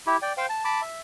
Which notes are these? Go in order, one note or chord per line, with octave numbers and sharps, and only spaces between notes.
E4 G4
D5 G5
C5 F5 G5
A5
A5 B5 D6
E5